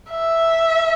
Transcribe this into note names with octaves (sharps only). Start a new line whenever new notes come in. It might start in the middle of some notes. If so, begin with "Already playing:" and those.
E5